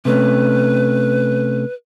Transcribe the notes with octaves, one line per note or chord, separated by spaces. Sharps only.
C3 A3 C#4 B4